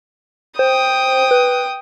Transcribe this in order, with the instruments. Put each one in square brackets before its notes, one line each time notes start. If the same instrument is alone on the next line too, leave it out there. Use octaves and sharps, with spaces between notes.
[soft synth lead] C5 [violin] G5 D#6
[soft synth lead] B4